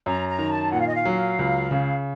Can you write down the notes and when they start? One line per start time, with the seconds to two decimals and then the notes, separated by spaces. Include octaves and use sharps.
0.06 F#2 A#5
0.28 A#5
0.39 D#3
0.50 A5
0.72 A#2 F#5
0.79 F5
0.86 D#5
0.94 F5
1.05 F#3
1.39 C#2
1.71 C#3